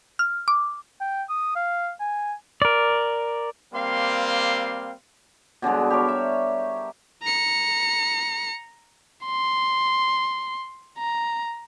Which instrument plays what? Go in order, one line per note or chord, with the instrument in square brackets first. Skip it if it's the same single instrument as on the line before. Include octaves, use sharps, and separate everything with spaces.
[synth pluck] F6
D6
[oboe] G5
D#6
F5
G#5
[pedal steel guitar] A#4 D5
[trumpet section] G3 A#3 C4 F5 C6
[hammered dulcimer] B2 D3 G3 G#3
G4 A#4 C#5
E5
[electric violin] A#5 C#7
C6
A#5